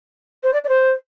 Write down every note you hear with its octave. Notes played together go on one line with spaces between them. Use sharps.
C5
D5
D5
C5